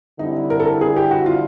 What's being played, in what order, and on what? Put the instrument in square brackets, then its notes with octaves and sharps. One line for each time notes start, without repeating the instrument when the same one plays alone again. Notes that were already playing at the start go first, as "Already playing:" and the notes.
[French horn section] D3 G3 C4 E4 [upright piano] D#4
[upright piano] A#4
A4
A#4
G#4
G4
F#4
F4